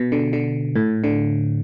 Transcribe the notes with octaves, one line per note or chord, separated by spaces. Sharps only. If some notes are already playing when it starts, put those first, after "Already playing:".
Already playing: B2
D3
D3
A2
D3